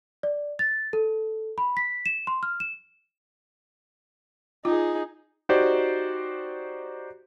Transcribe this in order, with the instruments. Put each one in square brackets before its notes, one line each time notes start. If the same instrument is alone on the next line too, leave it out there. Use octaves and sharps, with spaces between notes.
[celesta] D5
A6
A4
B5
B6
E7
C6
F6
E7
[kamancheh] D#4 G#4 [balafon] F4
[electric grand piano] D#4 F#4 G4 C5 D5